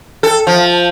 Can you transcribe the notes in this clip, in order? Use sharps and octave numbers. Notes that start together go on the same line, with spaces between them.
A4
F3